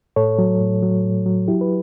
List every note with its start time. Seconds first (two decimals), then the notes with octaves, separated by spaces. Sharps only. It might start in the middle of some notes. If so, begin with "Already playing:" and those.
0.16 A2 A4 C#5
0.39 F#3
0.61 A2
0.82 F#3
1.04 A2
1.26 F#3
1.48 F#3 E4 G4
1.61 B4